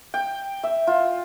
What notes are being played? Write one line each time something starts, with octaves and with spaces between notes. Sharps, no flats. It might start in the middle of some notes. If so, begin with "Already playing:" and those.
G5
E5
F4